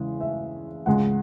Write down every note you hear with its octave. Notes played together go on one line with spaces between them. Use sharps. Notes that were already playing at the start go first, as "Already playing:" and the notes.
Already playing: E2 C#3 E3 G#3
E5
C#2 C#3 G#3 F#5